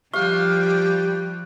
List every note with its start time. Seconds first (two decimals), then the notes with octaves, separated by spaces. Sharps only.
0.14 F3 G3 G4 F5 C#6 F#6